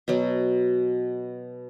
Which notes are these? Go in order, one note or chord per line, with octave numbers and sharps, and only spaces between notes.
B2 F#3